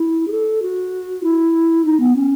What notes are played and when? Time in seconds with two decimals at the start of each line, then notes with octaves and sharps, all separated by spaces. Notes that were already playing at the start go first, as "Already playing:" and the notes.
Already playing: E4
0.27 G#4
0.32 A4
0.62 F#4
1.23 E4
1.85 D#4
2.00 B3
2.15 C#4